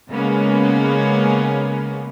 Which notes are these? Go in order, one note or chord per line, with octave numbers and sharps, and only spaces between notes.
C#3 G#3 A#3 B3 C#4